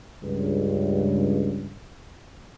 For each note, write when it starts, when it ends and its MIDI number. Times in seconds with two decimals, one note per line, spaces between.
0.22 1.73 37
0.22 1.73 43